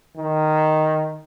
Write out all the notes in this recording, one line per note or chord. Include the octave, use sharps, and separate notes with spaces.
D#3